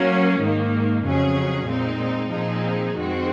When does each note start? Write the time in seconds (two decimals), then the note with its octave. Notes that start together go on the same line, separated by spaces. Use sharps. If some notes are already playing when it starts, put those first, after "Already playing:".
Already playing: F#3 A#3 C#4
0.40 G#2 D#3 A#3
1.04 F2 C#3 F#3 C#4 G#4
1.68 A#2 G#3 C4 D#4
2.32 A#2 F3 C4 D#4 G#4
2.95 F2 D#3 G#3 C4 F#4